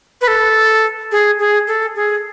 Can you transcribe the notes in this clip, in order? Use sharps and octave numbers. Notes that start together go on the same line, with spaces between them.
B4
A4
G#4
G#4
A4
G#4